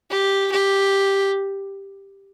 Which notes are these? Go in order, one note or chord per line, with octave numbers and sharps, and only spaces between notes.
G4
G4